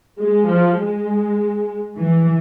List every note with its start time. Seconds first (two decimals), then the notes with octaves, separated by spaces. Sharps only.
0.19 G#3
0.49 F3
0.79 G#3
1.97 E3